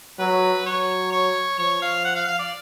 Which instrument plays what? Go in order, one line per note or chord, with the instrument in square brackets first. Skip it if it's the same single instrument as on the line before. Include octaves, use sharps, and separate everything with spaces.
[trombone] F#3 [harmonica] B4
[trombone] F#3 [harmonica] C#5
[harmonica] C#5
[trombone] F3 [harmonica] C#5
[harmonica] F5
F#5
F5
F5
D5